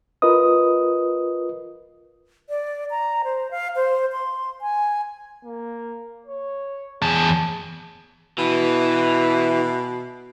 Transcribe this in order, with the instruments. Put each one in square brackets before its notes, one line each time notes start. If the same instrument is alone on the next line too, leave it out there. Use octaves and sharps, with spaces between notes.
[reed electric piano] F4 A#4 B4 D#5 D#6
[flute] D5
A#5
C5
F5
C5
C6
G#5
[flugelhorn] A#3
C#5
[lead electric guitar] E2 A5 [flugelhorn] G#4
[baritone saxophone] B2 [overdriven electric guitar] E3